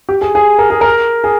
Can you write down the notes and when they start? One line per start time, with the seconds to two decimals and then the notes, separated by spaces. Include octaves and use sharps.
0.09 G4
0.21 G#4
0.35 G#4
0.59 A#4
0.70 G#4
0.81 A#4
1.24 G#4